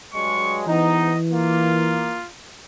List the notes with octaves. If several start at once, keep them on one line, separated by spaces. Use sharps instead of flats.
G2 F#3 G#3 C#6
G#2 E3 B3 D#4 D#5
A#3 F4